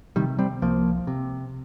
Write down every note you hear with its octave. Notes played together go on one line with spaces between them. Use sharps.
C3 D#3 G3
G3 C4
C2 F3 A#3
C3